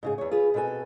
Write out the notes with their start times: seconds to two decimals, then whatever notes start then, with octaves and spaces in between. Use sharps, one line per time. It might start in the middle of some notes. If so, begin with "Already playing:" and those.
0.03 G#2 C#3 G#4
0.18 E2 C#5
0.31 F4 G#4 B4
0.54 B2 C4 F#4 A4 G#5